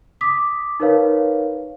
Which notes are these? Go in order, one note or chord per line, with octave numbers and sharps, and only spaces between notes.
D6 D#6 B6
D#4 A#4 B4 C#5 F5